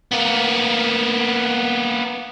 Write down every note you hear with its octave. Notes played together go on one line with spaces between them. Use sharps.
A#3 B3